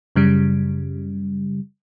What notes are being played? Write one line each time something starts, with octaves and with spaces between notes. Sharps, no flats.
F#2 C#3 G3